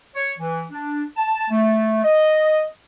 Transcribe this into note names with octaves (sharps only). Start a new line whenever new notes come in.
C#5
E3
D4
A5
A3
D#5